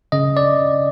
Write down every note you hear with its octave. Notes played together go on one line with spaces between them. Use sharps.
C#3 D#5
D5